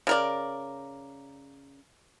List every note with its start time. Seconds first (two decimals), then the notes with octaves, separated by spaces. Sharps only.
0.07 C#3 A#4 D5